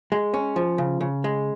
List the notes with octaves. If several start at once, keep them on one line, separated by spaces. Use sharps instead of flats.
G#3
C#4
F3
C#3
C#3
G#3